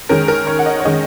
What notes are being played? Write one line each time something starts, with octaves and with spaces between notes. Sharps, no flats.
D#3 G#3 C#4 A#4
A#4
C#5
F#5
D#5
C#5
D#3 G#3 C#4 D#5